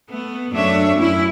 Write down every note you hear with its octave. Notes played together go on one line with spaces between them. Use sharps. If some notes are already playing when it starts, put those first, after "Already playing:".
A3 B3
F#2 A3 D4 C#5 E5
F#2 C#4 E4